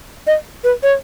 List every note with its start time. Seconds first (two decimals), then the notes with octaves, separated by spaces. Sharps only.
0.27 D#5
0.64 B4
0.83 C#5